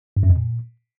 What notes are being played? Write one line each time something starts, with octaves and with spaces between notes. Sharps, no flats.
G2
F#2
F2
A#2